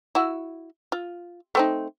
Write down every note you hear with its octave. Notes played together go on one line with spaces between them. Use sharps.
E4 F#4
F4
A3 C4 D#4